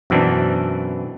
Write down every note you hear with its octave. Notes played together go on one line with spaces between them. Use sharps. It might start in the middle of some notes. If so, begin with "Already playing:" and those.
F#2 B2 E3 C4 D4